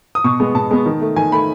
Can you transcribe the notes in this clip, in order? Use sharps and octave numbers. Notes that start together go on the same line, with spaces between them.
D#6
B2 C#6
G#3 B3
B2 A5
G#3 B3
D#3
A3
D#3 G#5
A3 B5